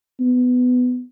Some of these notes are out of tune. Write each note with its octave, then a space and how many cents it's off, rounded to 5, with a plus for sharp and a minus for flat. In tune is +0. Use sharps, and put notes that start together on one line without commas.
B3 +15